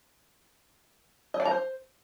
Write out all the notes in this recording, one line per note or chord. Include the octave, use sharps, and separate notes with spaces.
D#5
D5
A#5
C5